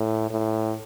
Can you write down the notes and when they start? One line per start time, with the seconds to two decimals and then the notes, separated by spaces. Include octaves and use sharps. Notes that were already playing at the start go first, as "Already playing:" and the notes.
Already playing: A2
0.31 A2